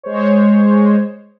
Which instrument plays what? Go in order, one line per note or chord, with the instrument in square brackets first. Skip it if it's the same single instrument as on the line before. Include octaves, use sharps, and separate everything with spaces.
[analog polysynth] G#3 C5 C#5